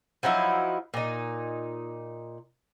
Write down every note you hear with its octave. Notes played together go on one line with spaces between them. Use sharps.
F3 F#3 D#4 E4
A#2 D#4